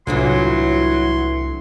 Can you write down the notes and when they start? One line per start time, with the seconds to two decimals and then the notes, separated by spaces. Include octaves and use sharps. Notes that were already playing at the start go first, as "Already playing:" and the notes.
0.07 C2 F2 A2 E3 F#3 D4 C6